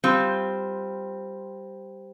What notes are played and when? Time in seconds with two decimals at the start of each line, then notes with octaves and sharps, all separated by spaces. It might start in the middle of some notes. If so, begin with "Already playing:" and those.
0.04 G3 C4 F4